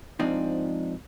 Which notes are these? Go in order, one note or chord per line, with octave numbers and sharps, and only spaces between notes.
F2 G#2 F3 C4 D4 D#4